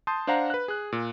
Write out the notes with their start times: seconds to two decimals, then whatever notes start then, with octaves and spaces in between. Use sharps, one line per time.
0.07 A5 C6 D#6 G6
0.27 D4 C5 F5 F#5 A#5
0.50 B4 F#6
0.68 G#4 F#6
0.92 A#2